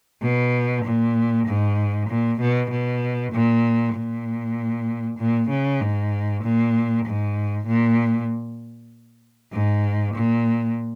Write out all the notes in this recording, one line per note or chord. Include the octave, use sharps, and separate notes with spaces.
B2
A#2
G#2
A#2
B2
B2
A#2
A#2
A#2
C#3
G#2
A#2
G#2
A#2
G#2
A#2